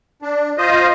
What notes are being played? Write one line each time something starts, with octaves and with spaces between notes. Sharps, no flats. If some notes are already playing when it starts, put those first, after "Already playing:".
D4
F4 C5 D#5